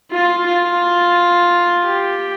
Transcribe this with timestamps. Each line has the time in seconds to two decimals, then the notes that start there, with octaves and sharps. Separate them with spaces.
0.11 F4
0.46 F4
1.85 G4